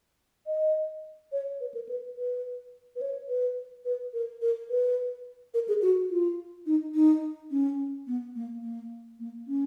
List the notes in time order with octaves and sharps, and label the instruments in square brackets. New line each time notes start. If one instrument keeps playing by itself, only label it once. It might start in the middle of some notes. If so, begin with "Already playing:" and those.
[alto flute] D#5
C#5
B4
A#4
B4
B4
B4
C#5
B4
B4
A#4
A#4
B4
A#4
G#4
F#4
F4
D#4
D#4
C#4
B3
A#3
A#3
A#3
C#4